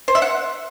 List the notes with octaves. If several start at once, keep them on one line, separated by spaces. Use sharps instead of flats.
C5
E5
F#5